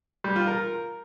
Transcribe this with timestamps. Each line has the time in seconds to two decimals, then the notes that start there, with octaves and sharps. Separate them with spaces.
0.24 G3
0.36 F4
0.47 A#4